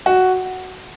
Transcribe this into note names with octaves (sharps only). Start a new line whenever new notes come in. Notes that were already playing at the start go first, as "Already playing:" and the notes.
F#4